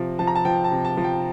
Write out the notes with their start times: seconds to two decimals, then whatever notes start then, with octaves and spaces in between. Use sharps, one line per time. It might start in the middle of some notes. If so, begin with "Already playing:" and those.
Already playing: C3 F3
0.19 F3 A5
0.27 A#5
0.35 A5
0.45 F3 G5
0.64 A5
0.72 C3
0.85 A5
0.97 F3
1.04 G5